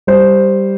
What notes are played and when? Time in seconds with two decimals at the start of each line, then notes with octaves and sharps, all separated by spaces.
0.07 G3 C5